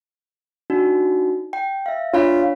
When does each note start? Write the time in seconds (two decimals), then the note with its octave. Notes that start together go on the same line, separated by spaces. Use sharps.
0.70 D4 D#4 F#4
1.53 G5
1.86 E5 F5
2.14 D4 F4 C#5 B5